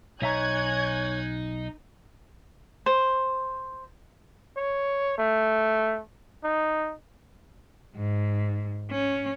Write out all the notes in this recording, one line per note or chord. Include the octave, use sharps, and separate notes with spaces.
B1 D#4 C#5 E5 G#5 A#5 F#6 G#6
C5
C#5
A3
D#4
G#2
C#4